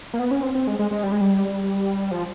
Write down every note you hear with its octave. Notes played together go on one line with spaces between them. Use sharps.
A#3
B3
C#4
C4
C4
G#3
G#3
G#3
G3
G#3
G3
F3